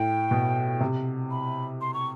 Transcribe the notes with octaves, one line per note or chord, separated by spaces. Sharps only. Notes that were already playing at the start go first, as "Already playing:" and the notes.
Already playing: A2 G5
B2
C3
B5
C6
C#6